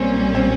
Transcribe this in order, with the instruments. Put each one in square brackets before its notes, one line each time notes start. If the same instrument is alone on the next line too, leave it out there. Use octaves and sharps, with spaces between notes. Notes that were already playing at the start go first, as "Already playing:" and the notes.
Already playing: [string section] B1 A#2 G3 A#3 C#4 [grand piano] C4
[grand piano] C4